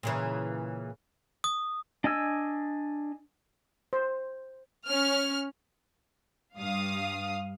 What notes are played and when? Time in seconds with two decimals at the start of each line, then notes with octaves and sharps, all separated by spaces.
0.03 A#2 C#3 E3
1.44 D#6
2.04 D4 D#5 G#5 E6
3.93 C5
4.87 C#4 F6
6.57 G2 F5 D#6